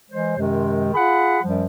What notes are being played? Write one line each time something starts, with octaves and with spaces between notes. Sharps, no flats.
E3 G#3 C5
F#2 C3 D#3 G#3
F4 G#4 F#5 B5
F#2 F3 G3